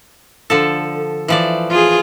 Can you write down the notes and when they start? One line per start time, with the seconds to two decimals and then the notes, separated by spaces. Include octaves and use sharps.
0.50 D3 F3 A4
1.28 E3 F3 D5
1.70 F4 G#4